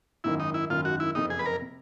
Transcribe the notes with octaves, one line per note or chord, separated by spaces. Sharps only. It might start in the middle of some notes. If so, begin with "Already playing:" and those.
G#1 F#2 D#3 E4
D#4
E4
G#1 F#2 D#3 F4
F#4
E4
F#1 F2 C3 D#4
G#4
B4
A#4
C3